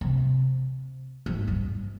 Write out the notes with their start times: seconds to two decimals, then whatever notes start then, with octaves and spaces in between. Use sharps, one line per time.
0.01 C3
1.26 G#2
1.48 G2